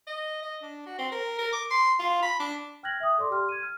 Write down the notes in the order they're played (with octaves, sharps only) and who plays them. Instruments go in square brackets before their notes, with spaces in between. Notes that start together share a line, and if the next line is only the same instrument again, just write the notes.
[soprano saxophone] D#5
D#5
D4
F#4
C4
A#4
A#4
D6
C6
F4
B5
D4
[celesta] G5 F6 F#6 G#6 A#6 F#7
E5 G5 D#6
A4 D5 C6 D6
G4 G5 C6 F6
G#6 D#7
F6